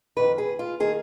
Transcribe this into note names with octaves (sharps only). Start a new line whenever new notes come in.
F2 D#3 B4
G#4
F4
D#3 G#4